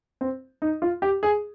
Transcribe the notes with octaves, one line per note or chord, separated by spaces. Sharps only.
C4
D#4
F4
G4
G#4